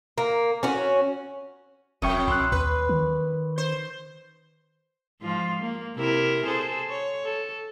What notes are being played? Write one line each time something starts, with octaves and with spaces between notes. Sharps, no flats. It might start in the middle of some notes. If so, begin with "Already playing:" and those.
A#3
C#4 F#4
E1 F2 G5 C#6 D#6
B1 C6 E6 F#6
D#2 B4
D#3
C5
G#2 F3 F4
A#3
C3 E4 A#4
G#4 A4 C5
C#5
A4